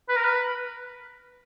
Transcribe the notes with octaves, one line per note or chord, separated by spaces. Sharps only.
B4
A#4
B4